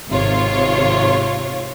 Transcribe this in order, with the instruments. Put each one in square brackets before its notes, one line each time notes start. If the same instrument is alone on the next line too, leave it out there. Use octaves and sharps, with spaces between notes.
[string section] G#1 C3 F4 C#5